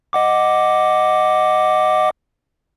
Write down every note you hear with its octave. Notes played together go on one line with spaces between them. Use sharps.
D#5 F#5 D6